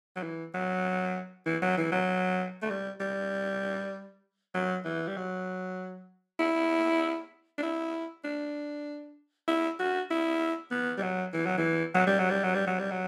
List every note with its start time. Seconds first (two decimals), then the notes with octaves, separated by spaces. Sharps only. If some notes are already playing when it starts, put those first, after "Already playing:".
0.16 F#3
0.23 E3
0.54 F#3
1.46 E3
1.62 F#3
1.77 E3
1.92 F#3
2.62 A3
2.70 G3
3.00 G3
4.54 F#3
4.85 E3
5.07 G3
5.17 F#3
6.39 E4
7.58 D4
7.62 E4
8.24 D4
9.48 E4
9.79 F#4
10.10 E4
10.71 B3
10.98 G3
11.02 F#3
11.33 E3
11.46 F#3
11.58 E3
11.94 F#3
12.06 G3
12.19 F#3
12.30 G3
12.43 F#3
12.55 G3
12.67 F#3
12.79 G3
12.91 F#3